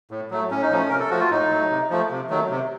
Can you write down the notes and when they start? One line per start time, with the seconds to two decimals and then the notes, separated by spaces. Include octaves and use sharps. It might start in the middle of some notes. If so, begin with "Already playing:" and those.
0.11 A2
0.31 F#3 A3
0.51 A2 C#4
0.62 D#4
0.71 F3 A3 C#4
0.89 C3 A#4
1.00 A4
1.10 F3 A3 F#4
1.20 F4
1.31 A2 D#4
1.50 F#3 A3
1.70 C3
1.90 F3 A3
2.11 C3
2.29 D#3 F#3 A3
2.50 C3